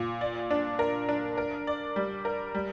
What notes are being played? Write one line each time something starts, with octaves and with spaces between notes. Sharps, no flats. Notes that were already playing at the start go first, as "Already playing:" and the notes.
Already playing: A#2
D5
D4
A#4
D4
A#4
D5
G3
A#4
G3